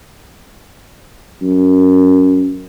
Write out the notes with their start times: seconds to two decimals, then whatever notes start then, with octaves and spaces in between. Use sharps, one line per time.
1.42 F#2